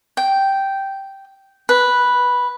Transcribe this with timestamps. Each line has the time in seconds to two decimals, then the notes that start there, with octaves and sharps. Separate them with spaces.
0.17 G5
1.69 B4